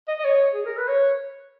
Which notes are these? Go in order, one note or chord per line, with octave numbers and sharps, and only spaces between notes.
D#5
D#5
C#5
G#4
A#4
B4
C#5